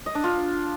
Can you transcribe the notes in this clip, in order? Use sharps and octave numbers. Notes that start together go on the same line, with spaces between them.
D#5
D4
F4